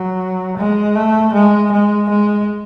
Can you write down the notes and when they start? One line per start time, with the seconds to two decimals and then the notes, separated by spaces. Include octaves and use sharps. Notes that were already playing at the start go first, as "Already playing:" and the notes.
Already playing: F#3
0.58 G#3
0.95 A3
1.33 G#3
1.72 G#3
2.09 G#3